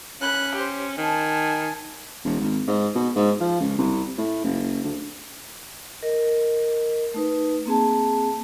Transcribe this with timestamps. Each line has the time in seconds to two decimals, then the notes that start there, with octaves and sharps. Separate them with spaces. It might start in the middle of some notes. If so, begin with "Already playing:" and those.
0.21 C#4 B5 F#6
0.55 G4 C5
0.97 D#3 G#5 A5
2.25 E1
2.40 G#1
2.67 G#2
2.95 B2
3.16 G#2
3.40 F3
3.60 C#2
3.78 C2
4.18 A2
4.44 F#1
4.84 D2
6.03 A#4 D#5
7.14 A3 D#4 B4
7.66 A#3 C4 G#4 A5